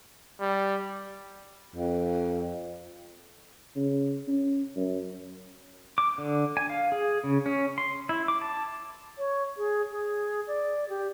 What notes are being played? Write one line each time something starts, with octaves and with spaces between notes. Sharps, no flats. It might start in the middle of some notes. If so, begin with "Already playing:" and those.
G3
F2
C#3
C#4
F#2
D6
D3
G#5
F5
G#4
C#3
C#4
C6
E4
D6
A5
C#5
G#4
G#4
D5
G4